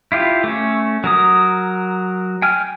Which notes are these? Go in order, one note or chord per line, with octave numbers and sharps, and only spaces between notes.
E4 F4 G4
A3 C#4
F#3 A#4 D#6
G5 G#5 F6